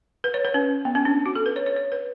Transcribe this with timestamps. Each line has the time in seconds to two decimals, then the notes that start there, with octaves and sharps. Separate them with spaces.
0.24 B4
0.34 C#5
0.45 B4
0.54 C#4
0.85 B3
0.95 C#4
1.05 D4
1.26 F#4
1.35 A4
1.46 B4
1.56 C#5
1.66 C#5
1.76 C#5
1.92 B4